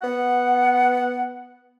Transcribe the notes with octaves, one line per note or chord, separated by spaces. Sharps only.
B3 F#5